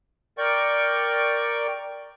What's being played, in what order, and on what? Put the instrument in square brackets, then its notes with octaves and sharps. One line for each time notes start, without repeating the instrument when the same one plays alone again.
[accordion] A#4 D5 G5 C#6